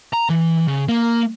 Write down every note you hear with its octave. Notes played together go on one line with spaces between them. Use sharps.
A#5
E3
C#3
A#3